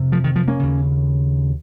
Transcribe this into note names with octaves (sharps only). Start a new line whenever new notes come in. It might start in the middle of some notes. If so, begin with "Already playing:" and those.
Already playing: F2 C3
F3
D#3
F3
A#3 C#4
D#2 C#3